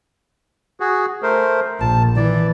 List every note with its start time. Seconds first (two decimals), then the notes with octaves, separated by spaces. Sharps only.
0.80 F#4 G#4
1.23 A3 A#4 C5
1.81 A#1 A5
2.16 E3 D5